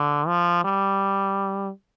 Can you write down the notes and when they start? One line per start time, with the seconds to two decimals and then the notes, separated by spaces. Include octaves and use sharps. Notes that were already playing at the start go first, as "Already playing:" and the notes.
Already playing: D3
0.27 F3
0.64 G3